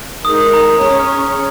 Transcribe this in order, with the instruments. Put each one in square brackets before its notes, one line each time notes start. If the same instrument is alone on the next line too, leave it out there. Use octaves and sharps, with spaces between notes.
[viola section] G#3 D#4 A#4 [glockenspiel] D#6
[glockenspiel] D#6
A#5
[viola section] C#4 G#4 C#5 [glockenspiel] A#5
[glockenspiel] D#6
F6
C#6